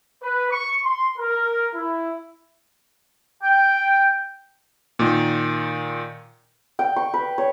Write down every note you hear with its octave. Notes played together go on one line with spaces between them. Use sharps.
B4
C#6
C6
A#4
E4
G5
A#2 D#3
G5
C#6
B4
C#5